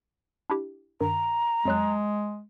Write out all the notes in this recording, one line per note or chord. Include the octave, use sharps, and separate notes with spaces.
D4 E4 G4
G2 D#3 A#5
F2 F#3 G#3 F#6